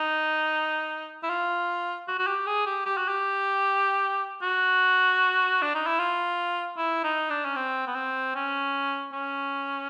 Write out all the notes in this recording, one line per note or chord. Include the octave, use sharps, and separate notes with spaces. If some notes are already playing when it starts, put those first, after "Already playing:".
Already playing: D#4
E4
F4
F#4
F#4
G4
G#4
G4
G4
F#4
G4
F#4
D4
D#4
E4
F4
E4
D#4
D4
C#4
C4
B3
C4
C#4
C#4